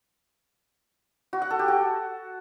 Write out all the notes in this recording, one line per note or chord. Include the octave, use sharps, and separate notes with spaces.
F#4
F#5
A4
G4
F#4